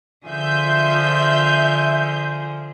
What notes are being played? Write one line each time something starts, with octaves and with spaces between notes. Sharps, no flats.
D3 F3 G#4 E5 G6